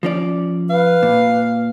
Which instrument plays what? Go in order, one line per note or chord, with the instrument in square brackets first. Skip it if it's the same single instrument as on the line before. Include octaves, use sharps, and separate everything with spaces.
[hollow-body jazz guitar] F3 C#4 D5
[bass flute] B4 [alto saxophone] F5
[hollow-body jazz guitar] A#2